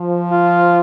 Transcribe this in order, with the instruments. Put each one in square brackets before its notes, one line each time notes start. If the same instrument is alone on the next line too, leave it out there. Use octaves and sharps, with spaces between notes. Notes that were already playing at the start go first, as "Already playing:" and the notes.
Already playing: [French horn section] F3
[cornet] F4